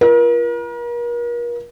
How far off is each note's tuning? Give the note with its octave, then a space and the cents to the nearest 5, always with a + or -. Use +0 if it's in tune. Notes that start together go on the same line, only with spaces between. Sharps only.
F4 -30 A#4 +40